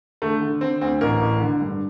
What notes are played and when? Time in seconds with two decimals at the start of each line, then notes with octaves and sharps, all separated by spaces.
0.22 D3 A3
0.41 D3
0.61 D3 C4
0.81 D2 C4
1.01 A1 A#4
1.21 A1
1.41 D3
1.61 G2